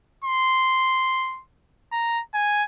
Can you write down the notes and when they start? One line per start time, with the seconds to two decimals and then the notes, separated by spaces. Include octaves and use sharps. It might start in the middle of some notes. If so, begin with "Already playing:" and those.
0.24 C6
1.92 A#5
2.34 G#5